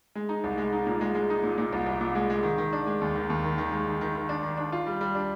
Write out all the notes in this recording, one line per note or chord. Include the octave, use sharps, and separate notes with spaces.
G#3
D#4
C2
G#3
D#4
A#2
G#3
G#3
D#4
A#2
A#2
C2
C2
A#2
G#3
G#3
D#3
D#3
D4
G#3
D#2
D#3
D#2
D#3
D#3
G#3
D#3
D#3
D#3
D4
D#3
D4
F4
G3
G3
D4